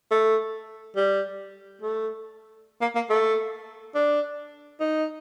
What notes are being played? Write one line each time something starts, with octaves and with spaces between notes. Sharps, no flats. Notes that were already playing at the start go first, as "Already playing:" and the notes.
A3
G3
A3
A#3
A#3
A3
D4
D#4